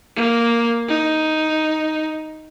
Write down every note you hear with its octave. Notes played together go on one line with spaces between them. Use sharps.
A#3
D#4